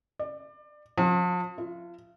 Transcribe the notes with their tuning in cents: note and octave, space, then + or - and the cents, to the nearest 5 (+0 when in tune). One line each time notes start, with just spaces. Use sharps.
D5 +25
F3 +35
F4 -30